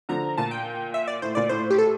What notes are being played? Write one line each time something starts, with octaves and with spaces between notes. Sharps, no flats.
D3 F3 A#5
A#2 A5
G5
E5
D5
A2 C5
A#2 D5
A2 C5
G4
A4